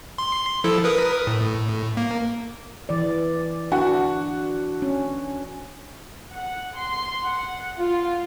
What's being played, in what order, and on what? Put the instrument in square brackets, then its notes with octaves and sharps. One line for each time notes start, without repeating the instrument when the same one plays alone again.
[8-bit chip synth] C6
F3 E4 A4
A#4 B4 D#6
A2
A#3
[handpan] E3 D5
[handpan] D4 [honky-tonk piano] F#4
[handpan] C#4
[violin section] F#5
C6
F#5
F4